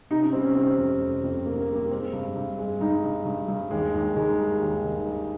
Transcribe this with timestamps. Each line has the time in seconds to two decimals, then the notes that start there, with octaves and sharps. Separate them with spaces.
0.11 C3 D#4
0.22 C#4
0.33 G3 C4
0.45 C#4
0.55 C3 C4
0.78 F2
1.01 F2
1.23 F2
1.46 C3 A#3
1.61 A#3
1.68 G3
1.75 A#3
1.91 G#3 C4
2.13 G2
2.36 G2
2.58 G#3
2.81 G2 D#4
3.04 G2
3.26 G2
3.48 G2
3.71 D#2 G#3
3.94 D#2
4.16 D#3 G#3
4.38 G3
4.61 D#2
4.84 D#3
5.07 G3